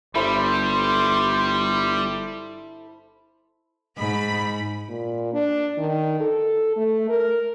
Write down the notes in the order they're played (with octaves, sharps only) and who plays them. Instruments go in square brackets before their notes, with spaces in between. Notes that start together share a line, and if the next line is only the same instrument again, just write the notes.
[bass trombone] G1 [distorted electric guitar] G3 [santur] E4 A4 C5 [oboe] C6
[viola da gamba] G#2 [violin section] B5
[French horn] A#2
D4
D#3
A4
A3
A#4